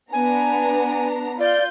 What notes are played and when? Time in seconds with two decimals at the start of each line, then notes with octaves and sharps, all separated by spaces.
0.13 B3 D4 G#5 A#5
1.40 F4 D5 G6